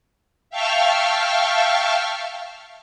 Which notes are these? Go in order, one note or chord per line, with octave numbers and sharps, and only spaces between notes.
E5 F5 G5 A5 C#6 F6